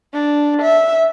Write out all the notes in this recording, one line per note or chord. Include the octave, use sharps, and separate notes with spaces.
D4
E5